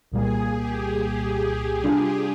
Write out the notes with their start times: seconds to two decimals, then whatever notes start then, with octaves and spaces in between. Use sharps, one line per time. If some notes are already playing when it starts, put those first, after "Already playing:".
0.12 C2 A#2 G3 A#3 G#4
0.55 G4
1.83 C3 G3 D4 F4 G#4